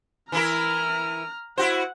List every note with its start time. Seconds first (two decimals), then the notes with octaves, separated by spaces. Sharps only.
0.32 E3 E4 A#4 A#5 F6
1.58 E4 F#4 C5 F#5